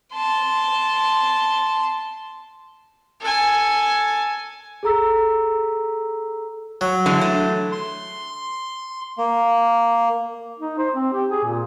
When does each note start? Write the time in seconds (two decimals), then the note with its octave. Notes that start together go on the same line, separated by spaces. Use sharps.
0.13 A5 C6
3.20 A4 G#5
4.83 G#4 A4 A#5 E6 B6
6.81 F#3
7.06 D3 E3 G#3
7.21 A3
7.72 C6
9.18 A#3
10.59 D#4
10.78 C5
10.94 C4
11.13 G4
11.30 G#4
11.44 A#2